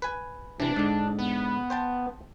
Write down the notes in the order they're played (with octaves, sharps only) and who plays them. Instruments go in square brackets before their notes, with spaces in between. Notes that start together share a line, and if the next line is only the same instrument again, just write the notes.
[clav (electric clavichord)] B4 G#5
[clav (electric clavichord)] C3 E3 [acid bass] D4
[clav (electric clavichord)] G#2 D3
[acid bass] B3
[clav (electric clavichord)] C5 G5 A5